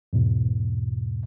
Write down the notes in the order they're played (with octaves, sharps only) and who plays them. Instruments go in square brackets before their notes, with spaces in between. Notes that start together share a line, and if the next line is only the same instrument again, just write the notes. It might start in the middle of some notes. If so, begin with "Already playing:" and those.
[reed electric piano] E2 G#2 B2